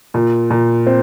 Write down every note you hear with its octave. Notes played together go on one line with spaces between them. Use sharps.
A#2
A#2
C4